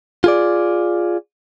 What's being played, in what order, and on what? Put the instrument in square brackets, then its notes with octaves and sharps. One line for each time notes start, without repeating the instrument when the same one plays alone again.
[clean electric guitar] F4 G#4 D5